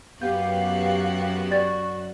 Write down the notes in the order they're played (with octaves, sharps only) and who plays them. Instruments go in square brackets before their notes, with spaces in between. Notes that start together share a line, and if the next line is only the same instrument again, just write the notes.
[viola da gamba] F#2 F#4 [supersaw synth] B3 G4 [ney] F5 [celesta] G6
[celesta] D5 A6 [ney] C#6